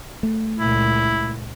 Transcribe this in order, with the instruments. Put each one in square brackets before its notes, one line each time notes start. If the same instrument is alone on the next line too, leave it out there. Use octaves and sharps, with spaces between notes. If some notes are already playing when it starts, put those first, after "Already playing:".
[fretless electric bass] A3
[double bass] C#2 A#2 [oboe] E4